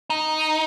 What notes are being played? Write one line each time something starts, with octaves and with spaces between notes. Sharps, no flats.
D#4